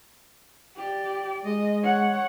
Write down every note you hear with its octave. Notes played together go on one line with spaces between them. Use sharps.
G4 D5
G#3 D#5
C#5 F#5